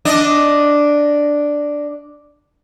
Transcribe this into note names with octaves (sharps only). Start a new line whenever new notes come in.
D4 D#5